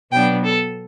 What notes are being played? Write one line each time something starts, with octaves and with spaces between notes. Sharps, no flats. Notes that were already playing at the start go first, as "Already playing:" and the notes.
B2 F#3 B3 D4 G5
A4